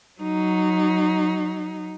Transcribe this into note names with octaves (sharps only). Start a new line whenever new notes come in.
F#3 D#4